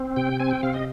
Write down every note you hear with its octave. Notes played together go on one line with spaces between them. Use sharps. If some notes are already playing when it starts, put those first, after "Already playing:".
Already playing: C4
C3 G5
C4 G#5
G5
C3 F5
D#5